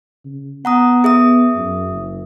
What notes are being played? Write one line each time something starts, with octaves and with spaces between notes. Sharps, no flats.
C#3
B3 F#5 A#5 D#6
G#4 E5 D#6
F#2
F#1